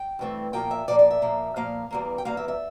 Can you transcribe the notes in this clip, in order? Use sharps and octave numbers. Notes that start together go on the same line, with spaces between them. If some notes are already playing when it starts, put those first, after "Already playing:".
Already playing: G5
G2 E3 A3 C4
A#2 F3 A#3 G5
E5
A#2 F3 A#3 D5
D5
E5
A#2 F3 A#3
A#2 F3 A#3 F5
E2 E3 G3 A#3
G5
E2 E3 G3 A#3 F5
E5
E5